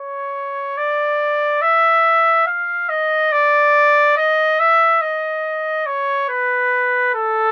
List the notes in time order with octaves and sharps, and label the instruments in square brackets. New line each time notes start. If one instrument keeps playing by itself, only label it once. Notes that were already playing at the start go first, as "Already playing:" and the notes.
Already playing: [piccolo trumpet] C#5
D5
E5
F5
D#5
D5
D#5
E5
D#5
C#5
B4
A4